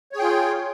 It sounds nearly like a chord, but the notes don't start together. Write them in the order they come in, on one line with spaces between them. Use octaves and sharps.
C#5 G#4 G5 F4